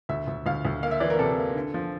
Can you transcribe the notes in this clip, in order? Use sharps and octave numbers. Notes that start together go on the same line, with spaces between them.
D2 E5
D2
D2 F5
D2
A#3 F5
E5
E3 D5
A#4
C3 A4
A#3
D3
F3